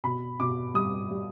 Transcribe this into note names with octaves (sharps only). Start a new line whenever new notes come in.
B2 B5
B2 D6
G3 D#6
G3